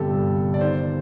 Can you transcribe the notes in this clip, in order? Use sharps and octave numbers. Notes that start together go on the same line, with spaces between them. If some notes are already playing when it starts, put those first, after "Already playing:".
Already playing: G1 G2 C3 G4 A4
G2
G1
D5
D#3 C5